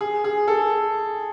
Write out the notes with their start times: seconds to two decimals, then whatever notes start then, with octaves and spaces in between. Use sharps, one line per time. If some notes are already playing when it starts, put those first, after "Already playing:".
0.01 G#4
0.24 G#4
0.48 A4